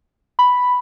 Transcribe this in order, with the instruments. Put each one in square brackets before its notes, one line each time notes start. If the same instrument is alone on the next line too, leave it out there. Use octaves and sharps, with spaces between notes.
[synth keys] B5